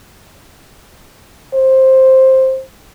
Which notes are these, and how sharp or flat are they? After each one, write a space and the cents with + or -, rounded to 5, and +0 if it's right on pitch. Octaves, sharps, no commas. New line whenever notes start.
C5 +10